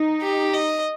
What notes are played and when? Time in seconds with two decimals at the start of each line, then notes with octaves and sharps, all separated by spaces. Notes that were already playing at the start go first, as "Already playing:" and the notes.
Already playing: D#4
0.22 G4
0.54 D#5